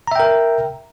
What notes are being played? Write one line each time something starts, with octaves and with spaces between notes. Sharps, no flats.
A#4 E5 G5 A#5